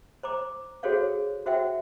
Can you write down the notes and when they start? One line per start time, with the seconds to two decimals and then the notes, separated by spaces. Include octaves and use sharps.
0.23 C5 A#5 D6
0.83 F#4 G#4 A4 C5 C#5 F5
1.46 F#4 C5 E5 F#5 G5